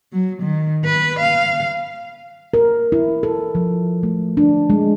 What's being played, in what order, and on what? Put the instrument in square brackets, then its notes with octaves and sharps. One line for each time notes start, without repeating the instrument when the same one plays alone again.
[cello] F#3
D#3
B4
F5
[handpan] A#4
E4
A4
F3
A3
D4
G#3